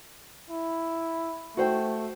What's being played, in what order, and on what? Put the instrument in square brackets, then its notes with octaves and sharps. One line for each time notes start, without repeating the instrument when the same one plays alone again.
[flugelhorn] E4
[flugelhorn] A3 [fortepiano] F#4 C5 G5